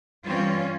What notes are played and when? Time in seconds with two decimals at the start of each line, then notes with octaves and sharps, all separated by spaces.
0.24 G2 E3 G3 C4 C#4 F4